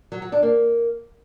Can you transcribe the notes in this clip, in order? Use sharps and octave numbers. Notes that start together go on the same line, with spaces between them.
F#3
F#3
D4
A#3